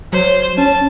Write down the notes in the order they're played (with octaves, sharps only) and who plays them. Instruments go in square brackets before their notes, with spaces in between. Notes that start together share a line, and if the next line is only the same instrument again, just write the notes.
[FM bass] F#3 [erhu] C5 [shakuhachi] C#5
[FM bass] C#4 [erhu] A5